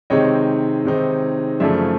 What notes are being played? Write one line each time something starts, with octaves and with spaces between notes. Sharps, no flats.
C3 D#3 G#3 C4 D#4 C#5 D#5
C3 D#3 G#3 C4 D#4
F#2 C#3 F3 A3 D5 E5